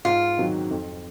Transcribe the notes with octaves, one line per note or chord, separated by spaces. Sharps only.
G#2 F4
D#3 F#3 C4
F2